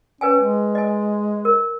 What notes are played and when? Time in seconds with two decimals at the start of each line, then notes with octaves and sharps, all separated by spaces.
0.21 C#4 B4 G5 G#5
0.40 G#3
0.75 D#5 G#5
1.45 A#4